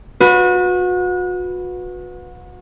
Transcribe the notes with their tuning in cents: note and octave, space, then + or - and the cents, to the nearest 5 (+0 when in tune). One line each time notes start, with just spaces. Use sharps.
F#4 -35 B4 +0